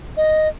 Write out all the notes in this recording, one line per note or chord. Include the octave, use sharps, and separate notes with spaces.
D#5